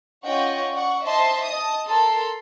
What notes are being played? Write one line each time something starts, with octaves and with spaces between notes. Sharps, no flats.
C#4 F4 D#5 F#5 G5 C#6
D5 F#5 C#6
C5 D#5 E5 A5 C6
D#5 A5 D#6
A4 A#4 A5 C6